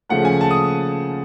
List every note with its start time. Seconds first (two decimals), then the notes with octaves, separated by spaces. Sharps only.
0.09 C#3 F3 A3 F#5
0.25 G#5
0.41 A5
0.51 D#6